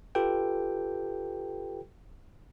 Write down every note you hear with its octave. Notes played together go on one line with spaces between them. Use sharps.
F4 G4 A4 B4 G5